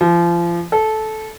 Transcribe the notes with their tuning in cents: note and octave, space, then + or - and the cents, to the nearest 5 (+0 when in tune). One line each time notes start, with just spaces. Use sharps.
F3 -30
A4 -15